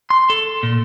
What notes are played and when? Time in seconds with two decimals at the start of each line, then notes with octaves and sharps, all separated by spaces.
0.10 C6
0.30 A4
0.63 A#2